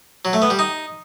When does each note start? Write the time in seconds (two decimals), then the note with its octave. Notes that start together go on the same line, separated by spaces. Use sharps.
0.25 F#3
0.33 A3
0.42 B3
0.50 G3
0.59 D#4